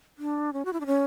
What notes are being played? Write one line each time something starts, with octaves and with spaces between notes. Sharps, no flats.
D4
C#4
F#4
E4
D4
C#4